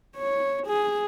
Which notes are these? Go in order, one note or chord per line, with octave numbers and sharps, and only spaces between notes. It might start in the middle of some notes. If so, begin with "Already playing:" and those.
C#5
G#4